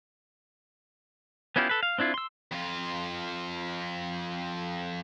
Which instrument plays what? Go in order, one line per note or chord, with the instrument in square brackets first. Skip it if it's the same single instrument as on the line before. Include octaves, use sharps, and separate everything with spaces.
[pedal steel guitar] B3 C#4 E4 F4 G4
A4 B4
F5
C4 D4 E4 F4
C6 E6
[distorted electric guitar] F2 F4